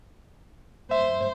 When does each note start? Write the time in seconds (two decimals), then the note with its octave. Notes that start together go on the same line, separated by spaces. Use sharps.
0.91 C5 E5